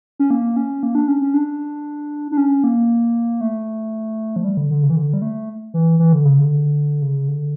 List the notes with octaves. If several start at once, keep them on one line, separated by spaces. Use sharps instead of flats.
C#4
A#3
C#4
A#3
D4
C#4
C#4
D4
D4
C#4
A#3
A3
F3
G3
D3
D3
C#3
E3
D3
G3
A3
E3
E3
D3
C#3
D3
C#3
D3